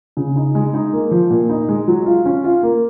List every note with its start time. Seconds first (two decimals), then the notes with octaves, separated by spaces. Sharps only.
0.17 C#3
0.36 D#4
0.55 G#3
0.74 D#4
0.93 A#3
1.11 F3
1.30 A#2
1.49 D#4
1.69 G#3
1.88 F#3
2.06 F4
2.25 C#4
2.44 F4
2.63 A#3